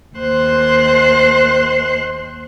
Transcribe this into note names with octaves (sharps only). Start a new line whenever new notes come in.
D#2 C5 C6 F#6